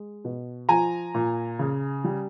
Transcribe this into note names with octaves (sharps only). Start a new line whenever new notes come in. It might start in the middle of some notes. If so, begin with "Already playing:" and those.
Already playing: G#3
B2
F3 G#5 A#5
A#2
C#3
G3